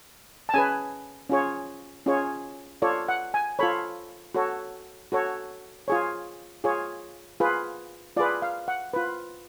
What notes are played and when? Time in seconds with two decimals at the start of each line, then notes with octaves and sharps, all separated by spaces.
0.49 A5
0.54 C#4 G#4 B4 G#5
1.29 C#4 F4 G#4 C#5
2.06 C#4 F4 G#4 C#5
2.82 F4 A4 C#5 D5
3.09 F#5
3.34 G#5
3.59 F4 A4 C#5 B5
4.35 F#4 A4 C#5
5.12 F#4 A4 C#5
5.88 F4 G#4 C#5
6.64 F4 G#4 C#5
7.40 F4 G#4 B4
8.17 F4 G#4 B4 D5
8.42 F5
8.68 F#5
8.94 F4 B4